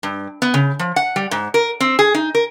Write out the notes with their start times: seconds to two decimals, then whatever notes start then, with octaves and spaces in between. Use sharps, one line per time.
0.03 G2
0.42 B3
0.54 C#3
0.79 F3
0.96 F#5
1.16 G3
1.31 G#2
1.54 A#4
1.80 C4
1.99 G#4
2.15 D#4
2.35 A#4